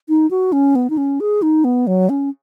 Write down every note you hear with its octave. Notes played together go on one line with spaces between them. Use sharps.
D#4
F#4
C#4
B3
D#4
C#4
G#4
D#4
B3
F#3
C#4